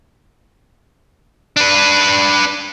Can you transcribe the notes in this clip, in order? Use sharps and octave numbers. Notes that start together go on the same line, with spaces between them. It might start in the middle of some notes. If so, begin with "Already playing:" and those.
D4 B4